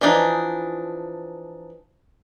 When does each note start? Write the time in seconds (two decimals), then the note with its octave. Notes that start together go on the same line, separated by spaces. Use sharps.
0.01 E3 F3 D4 D#4